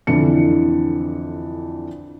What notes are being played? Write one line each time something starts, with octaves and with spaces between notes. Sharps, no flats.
F2 D3 E3 D4 E4 C#7